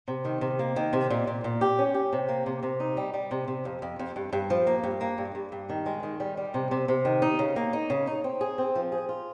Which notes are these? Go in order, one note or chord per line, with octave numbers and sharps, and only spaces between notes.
C3
D#3
C3
A#3
D#3
C3
A#2
A#2
A#2
G4
C#4
G4
C3
A#3
C3
C3
D#4
G3
G3
C3
C3
F2
F2
F2
G2
G2
F3
A#3
G2
A#3
G2
G2
G2
D#3
G#3
D#3
G3
G3
C3
C3
C3
D#3
D#4
C#3
A#3
D#4
C#3
D#4
C4
G#4
C4
F3
G#4
F4